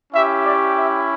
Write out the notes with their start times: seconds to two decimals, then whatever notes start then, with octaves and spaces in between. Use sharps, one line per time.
0.13 C#4 E4 G4 E5
0.45 D5
0.77 E5